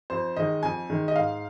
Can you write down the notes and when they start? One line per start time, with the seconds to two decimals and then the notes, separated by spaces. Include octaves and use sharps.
0.10 F2 C5
0.36 D#3 G#3 D#5
0.63 F2 G#5
0.90 D#3 G#3
1.08 D#5
1.16 G#2 F5